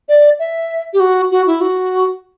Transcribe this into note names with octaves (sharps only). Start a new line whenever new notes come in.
D5
E5
G4
F#4
F#4
E4
F#4